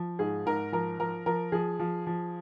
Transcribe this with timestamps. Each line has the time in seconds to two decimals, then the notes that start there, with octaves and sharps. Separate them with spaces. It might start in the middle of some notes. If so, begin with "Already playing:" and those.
Already playing: F3
0.19 G#2 G#4
0.46 G#2 A#4
0.72 F3 A#4
0.99 F3 A#4
1.26 F3 A#4
1.52 F3 G#4
1.80 F3
2.07 F3